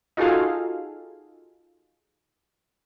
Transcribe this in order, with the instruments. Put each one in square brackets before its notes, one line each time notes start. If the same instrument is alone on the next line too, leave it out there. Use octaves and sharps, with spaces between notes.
[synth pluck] D#4 F4 F#4 G#4 A4 F5